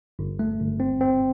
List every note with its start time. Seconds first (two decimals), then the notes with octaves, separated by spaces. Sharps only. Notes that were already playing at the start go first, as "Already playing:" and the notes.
0.19 G1
0.39 A3
0.60 G1
0.80 C4
1.01 C4